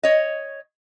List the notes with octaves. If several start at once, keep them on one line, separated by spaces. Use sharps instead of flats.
C#5 D#5